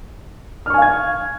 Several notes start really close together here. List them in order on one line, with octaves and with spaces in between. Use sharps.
F6 C#6 G#5 F5 G#6